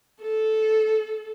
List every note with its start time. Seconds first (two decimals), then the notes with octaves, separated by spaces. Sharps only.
0.21 A4